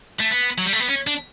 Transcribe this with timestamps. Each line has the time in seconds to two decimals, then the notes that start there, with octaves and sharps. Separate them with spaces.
0.20 A3
0.31 B3
0.58 F#3
0.66 G3
0.73 A3
0.80 B3
0.88 C#4
1.07 D4